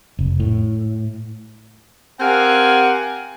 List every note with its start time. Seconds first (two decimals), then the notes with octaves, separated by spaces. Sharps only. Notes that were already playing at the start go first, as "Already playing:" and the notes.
0.19 F1
0.40 A2
2.20 C4 G4 A#4 F5 F#5 G#5